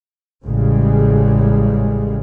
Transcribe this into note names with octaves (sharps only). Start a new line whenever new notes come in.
A1 C#3 G3 G#3